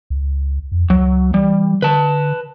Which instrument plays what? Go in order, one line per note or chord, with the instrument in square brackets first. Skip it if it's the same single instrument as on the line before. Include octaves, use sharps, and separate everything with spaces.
[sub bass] C#2
F2
[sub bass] C#2 [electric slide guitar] F#3
[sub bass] E3 [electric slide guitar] G3
[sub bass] D3 [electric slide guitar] B4 A5